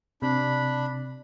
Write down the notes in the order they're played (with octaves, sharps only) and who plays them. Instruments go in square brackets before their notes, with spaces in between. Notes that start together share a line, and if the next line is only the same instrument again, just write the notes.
[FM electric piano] C3 [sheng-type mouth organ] D4 B5